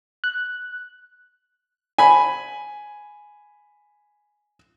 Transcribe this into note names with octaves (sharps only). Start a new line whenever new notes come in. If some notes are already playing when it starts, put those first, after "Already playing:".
F#6
G#5 B5